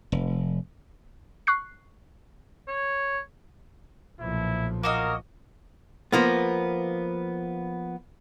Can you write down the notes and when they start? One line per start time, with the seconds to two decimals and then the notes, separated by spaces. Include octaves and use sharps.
0.12 F1
1.47 C#6 F#6 C7
2.68 C#5
4.20 B1 A#2 F3 E4
4.83 A#3 F#4 A#4 D#5
6.12 F3 A#3 B3